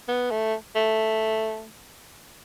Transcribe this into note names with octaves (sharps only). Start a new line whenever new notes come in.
B3
A3
A3